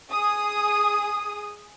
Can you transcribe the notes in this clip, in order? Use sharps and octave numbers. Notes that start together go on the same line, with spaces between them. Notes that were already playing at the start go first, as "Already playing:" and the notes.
G#4 D#6